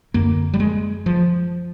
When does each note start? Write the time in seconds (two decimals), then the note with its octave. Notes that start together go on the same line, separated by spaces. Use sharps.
0.14 F#2 D3 A#3
0.54 G3
0.60 G#3
1.06 F3